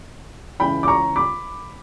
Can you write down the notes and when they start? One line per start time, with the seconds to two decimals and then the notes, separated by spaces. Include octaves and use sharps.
0.60 C#2 C#3 E3 G5 B5
0.83 D6
0.88 A#5 C#6
1.16 B5 D6